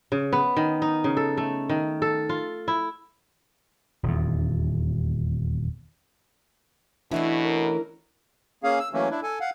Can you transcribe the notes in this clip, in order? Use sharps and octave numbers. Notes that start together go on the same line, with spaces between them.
C#3
B3
D#3
D#4
C#3
A4
A3
D#3
A4
F4
E4
D#1 E2
B2 E3 A3 C#4 D4 E4 E5
A#4
A#3 C#4 G#4 F5
E6
E3 F#3 A3 A#3 C#4
D4 E4
A4 G#5
F5 F#5